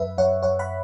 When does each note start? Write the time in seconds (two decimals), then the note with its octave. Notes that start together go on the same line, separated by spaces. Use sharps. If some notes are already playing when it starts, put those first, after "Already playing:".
Already playing: F#2 B4 E5
0.18 F#2 C#5 F#5
0.43 F#2 C#5 F#5
0.59 F#5 B5